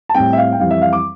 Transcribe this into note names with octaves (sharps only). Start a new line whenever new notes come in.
A5
A2 G3 C4 G5
E5
F5
G5
F2 E3 G3 F5
E5
F5
D6